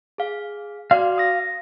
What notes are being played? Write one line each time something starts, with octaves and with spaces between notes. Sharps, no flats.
G#4 F5
F#4 D5 F5 C6
D#6 A#6